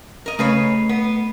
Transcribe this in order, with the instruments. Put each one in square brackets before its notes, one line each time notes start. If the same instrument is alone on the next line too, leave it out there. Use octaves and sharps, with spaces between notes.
[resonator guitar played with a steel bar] A#4 D#5
[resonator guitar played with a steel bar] C#3 B4 C#5 [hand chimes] A3 C7
[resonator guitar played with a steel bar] B3